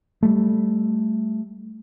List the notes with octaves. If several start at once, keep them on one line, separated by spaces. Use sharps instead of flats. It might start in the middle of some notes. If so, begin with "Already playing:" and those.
G3 A3